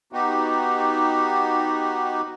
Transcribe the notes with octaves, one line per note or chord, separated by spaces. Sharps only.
B3 D#4 F#4 G4